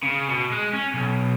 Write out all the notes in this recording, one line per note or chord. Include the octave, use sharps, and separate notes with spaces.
C#3
B2
G#3
C#4
B1